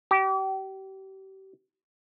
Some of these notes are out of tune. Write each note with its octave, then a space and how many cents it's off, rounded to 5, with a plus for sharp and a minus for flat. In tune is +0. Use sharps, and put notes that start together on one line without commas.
G4 -35